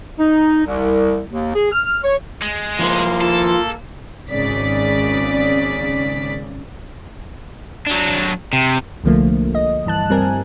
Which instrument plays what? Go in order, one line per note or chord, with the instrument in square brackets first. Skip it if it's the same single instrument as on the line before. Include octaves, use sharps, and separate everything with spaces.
[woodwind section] D#4
C2
D#2
G#4
F6
C#5
[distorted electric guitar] G#3
[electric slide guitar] F3 E4 C5 [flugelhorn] A#3
[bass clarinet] F4 [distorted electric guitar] A4
[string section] G#1 C#3 D5 B6
[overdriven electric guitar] F#3 D4
C3
[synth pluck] C2 D3 F3 A3 A#3
D#5
G2 E3 A5 F#6
G2 G3 C4 A#4 G#5